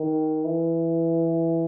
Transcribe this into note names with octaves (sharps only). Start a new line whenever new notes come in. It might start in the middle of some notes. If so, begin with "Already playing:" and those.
Already playing: D#3
E3